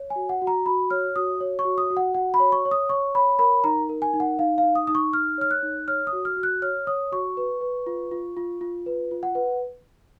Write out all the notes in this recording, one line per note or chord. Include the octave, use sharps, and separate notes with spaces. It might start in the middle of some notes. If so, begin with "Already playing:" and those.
Already playing: C#5
G#5
F#4
F#5
F#4
A#5
F#4 B5
C#5 F6
F#4 D#6
C#5
C#6
F#4
D#6
F#4
F#5
F#4 F#5
B5
C#5
C#6
C#5
D#6
C#5 C#6
C#5 B5
A#4 B5
D#4 A#5
A#4
G#5
D#4
F#5
D#4 F5
F5
D#4
D#6
D#4 D#6
C#6
D#4 F6
C#5 F6
F#6
D#4
C#5 F6
D#6
F#4
F6
F#4
F#6
C#5 F6
C#5 D#6
F#4 C#6
B4
B4
F4
F4
F4
F4
B4
F4
F#5
B4